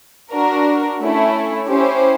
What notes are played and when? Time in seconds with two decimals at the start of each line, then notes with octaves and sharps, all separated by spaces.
0.32 D4 F#4 A#4
1.01 A3 C#4 E4
1.68 C#4 E4 G4 C5